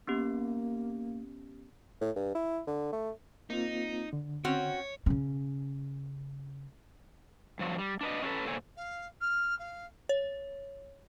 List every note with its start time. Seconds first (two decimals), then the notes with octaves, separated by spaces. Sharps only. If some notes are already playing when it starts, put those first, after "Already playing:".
0.07 A#3 B3 C#4 G4
2.01 A2
2.16 G2
2.35 E4
2.67 D3
2.92 A3
3.50 A#3 C4 D#4 F4
4.13 D3
4.45 C4 C#4 F#4 C#5
5.06 C#3 C#4
7.59 G2 F3 F#3
7.79 G3
8.01 D4 B4 D#5
8.22 C#4 E4 F#4 A4 B4
8.45 A#2 A4 C5 C#5 G#5
8.76 F5
9.21 F6
9.58 F5
10.09 C#5